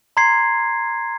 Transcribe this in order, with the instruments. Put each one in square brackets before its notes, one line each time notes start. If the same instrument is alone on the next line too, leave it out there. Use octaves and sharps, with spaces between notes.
[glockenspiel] A#5 C6 G#6 C7